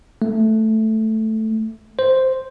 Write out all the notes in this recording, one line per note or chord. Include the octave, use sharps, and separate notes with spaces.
A3
C5